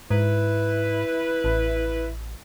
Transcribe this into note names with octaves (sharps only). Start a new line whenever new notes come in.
G#2 E4 B4
A1